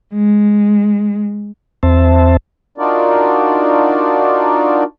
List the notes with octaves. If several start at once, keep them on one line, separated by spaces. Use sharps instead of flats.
G#3
E2 C4 C5 E5 A5
D4 D#4 F4 F#4 A#4 D5